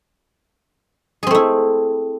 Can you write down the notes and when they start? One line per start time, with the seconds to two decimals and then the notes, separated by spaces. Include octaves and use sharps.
1.23 G#4
1.27 C4
1.31 A3
1.35 E4